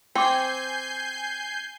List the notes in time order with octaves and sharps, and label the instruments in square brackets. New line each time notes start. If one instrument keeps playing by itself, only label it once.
[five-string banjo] C4 [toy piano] G5 D6 [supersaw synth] G#5 G6 C7